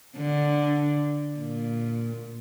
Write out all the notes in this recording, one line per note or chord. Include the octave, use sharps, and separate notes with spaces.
D3
A#2